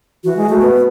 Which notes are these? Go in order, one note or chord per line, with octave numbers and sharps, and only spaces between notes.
E3 F#4
G#3
A3
B3